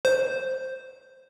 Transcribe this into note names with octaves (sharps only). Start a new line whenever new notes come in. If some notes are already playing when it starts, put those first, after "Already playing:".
C5